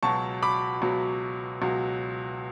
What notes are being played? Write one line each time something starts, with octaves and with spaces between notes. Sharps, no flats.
C#2 B2 F#3 A5 C#6
B5 D6
C#2 B2 F#3
C#2 B2 F#3